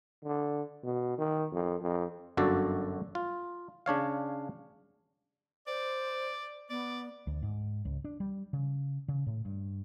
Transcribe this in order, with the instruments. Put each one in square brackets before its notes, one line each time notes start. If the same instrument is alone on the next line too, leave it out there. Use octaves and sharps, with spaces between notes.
[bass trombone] D3
B2
D#3
F2
F2
[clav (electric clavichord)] G1 F#2 D3 F#4 A4 D5
F4
C#3 D4 C#5 F5
[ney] C5 [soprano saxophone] D5
[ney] B3 [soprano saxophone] D5
[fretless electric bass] D2
G#2
C#2
D4
G3
C#3
C#3
A2
G2